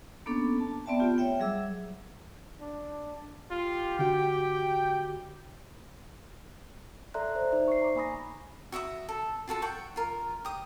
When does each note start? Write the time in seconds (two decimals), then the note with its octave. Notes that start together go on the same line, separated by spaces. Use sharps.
0.26 A#3 B3 C#4 D4 A4 D6
0.60 A5
0.86 B3 C4 D5 E5 G5 A5
1.00 A3 B3 F4 G4
1.18 C#5 E5 G5
1.40 F#3 G3 G#4 E5 D6 E6
2.61 D4
3.51 F4 G4
3.99 D3 F#4 G5
7.14 A4 D5 E5 A#5 C6 F#6
7.35 C5
7.52 D#4 C5 D5 E5
7.68 C#6 C7
7.82 A#5 D6
7.95 A#3 G#5 B5 D#6 A#6
8.72 F#4 E5 B5 D#6
9.09 A4
9.48 F4 F#4 A4 A5
9.62 F#5 G5 C#6
9.96 F4 A#4
10.45 G4 D#6